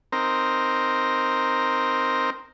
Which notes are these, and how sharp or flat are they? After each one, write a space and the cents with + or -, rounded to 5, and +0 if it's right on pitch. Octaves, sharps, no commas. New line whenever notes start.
C4 +0 D#4 +0 A#4 +0